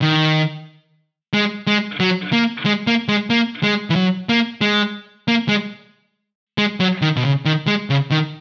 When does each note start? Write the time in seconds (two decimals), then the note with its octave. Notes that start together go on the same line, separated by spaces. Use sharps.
0.02 D#3
1.34 G#3
1.67 G#3
2.00 F#3
2.33 A#3
2.65 G#3
2.87 A#3
3.08 G#3
3.30 A#3
3.63 G#3
3.90 E3
3.96 F#3
4.29 A#3
4.61 G#3
5.28 A#3
5.49 G#3
6.58 G#3
6.80 F#3
7.02 D#3
7.16 B2
7.25 C#3
7.45 D#3
7.67 G#3
7.90 C#3
8.11 D#3